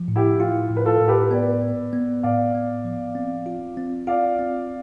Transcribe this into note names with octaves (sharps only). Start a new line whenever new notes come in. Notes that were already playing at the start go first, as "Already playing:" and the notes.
Already playing: F3
A2
E4 G4
E4 F4
A2
B4
F4 A4
A2
G4 B4
B3 B4 D5
B3
B3
A2 D5 F5
B3
F3
C4
F4
C4
F4 D5 F5
C4